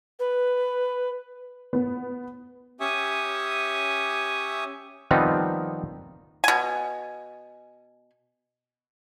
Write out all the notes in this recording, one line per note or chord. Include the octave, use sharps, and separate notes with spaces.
B4
B3
C#4 G4 E5 G#5 C#6 D#6
D#3 F3 G3 B3 C4 D#4
B2 G#5